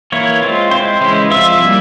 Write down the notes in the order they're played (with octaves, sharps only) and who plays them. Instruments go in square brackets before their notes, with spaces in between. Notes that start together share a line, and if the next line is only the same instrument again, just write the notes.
[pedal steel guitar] E3 A#3 E4 C#5
G#3 C4 F4
G#3 C4 E4 C5
C#3 E3 G#3 C#4 E4
F3 G#3 C4 F4 E5
G3 A#3 E4